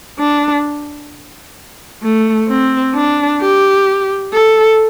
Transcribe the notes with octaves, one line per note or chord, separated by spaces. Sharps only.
D4
A3
C4
D4
G4
A4